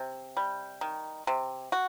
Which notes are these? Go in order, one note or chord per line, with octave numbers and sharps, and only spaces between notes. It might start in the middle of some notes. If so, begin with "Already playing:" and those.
Already playing: C3
G3
D#3
C3
F#4